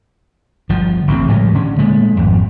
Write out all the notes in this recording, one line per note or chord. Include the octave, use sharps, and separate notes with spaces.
G1 F3
A1 D3 G3 C4
A2 F3 G3 G#3
D3 C#4
A#2 G#3 A3
G#1 F2